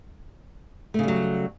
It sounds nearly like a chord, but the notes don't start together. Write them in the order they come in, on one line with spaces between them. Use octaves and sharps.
A3 C#3 G3 F#3